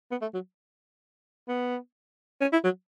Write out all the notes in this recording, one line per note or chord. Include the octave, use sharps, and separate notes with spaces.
B3
A3
F#3
B3
C#4
E4
F#3